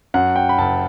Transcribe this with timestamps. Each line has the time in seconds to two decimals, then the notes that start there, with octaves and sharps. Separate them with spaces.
0.14 F#2 F#5
0.36 G5
0.49 B5
0.58 F#1 A5